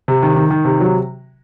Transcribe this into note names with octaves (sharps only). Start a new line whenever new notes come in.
C3
D#3
D#3
D#3
C3
F#3